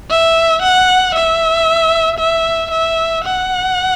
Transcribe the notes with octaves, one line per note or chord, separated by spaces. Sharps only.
E5
F#5
E5
E5
E5
F#5